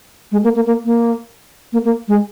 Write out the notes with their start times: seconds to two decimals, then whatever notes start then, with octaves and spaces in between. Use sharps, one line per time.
0.32 G#3
0.44 A#3
0.56 A#3
0.67 A#3
0.85 A#3
1.73 A#3
1.85 A#3
2.08 G#3